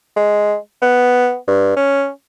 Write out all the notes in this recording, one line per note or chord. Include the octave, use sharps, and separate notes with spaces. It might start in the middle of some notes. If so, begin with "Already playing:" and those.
G#3
B3
G2
C#4